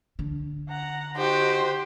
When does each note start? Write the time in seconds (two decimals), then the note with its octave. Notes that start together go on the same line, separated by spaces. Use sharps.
0.19 D3
0.68 F#5 A#5
1.17 D#4 F#4 G4 C5